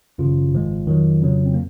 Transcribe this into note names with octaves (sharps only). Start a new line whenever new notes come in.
G#1 F#2 C#3 F3 F4
G#1 G#2 F3 G#3
F2 D#3 F#3
F2 C#3 F#3
C4
A#3